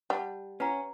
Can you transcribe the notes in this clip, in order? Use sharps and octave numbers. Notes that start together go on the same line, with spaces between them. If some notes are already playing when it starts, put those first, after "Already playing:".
G3 F#5 A5
C#4 B4 F#5 A#5